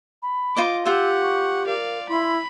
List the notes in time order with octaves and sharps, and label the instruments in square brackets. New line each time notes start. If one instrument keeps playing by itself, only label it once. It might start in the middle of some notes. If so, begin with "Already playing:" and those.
[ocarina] B5
[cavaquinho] F4 C5 D#5 [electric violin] D6
[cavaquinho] F4 C5 [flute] G4 [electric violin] F#5 [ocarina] E6
[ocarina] C#6
[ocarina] A#4 [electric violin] D5 F5
[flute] E4 [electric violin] B5 [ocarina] C6